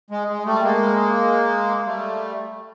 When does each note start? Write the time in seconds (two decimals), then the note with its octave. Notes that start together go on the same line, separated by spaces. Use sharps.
0.11 G#3
0.28 G#3
0.45 G3 A3
0.63 G#3 A#3
1.85 G3 A3